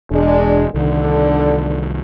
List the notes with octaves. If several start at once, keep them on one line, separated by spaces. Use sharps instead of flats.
E1 G#3 D4
C2 D3 D#3